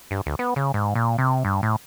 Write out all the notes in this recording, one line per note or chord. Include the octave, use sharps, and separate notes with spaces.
G2
D2
B3
C#3
G#2
A#2
C3
G2
A2